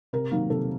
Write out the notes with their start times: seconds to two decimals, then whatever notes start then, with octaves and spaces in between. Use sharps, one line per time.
0.13 C3 A#4
0.31 D#3 F#3 A#3
0.50 C3 A4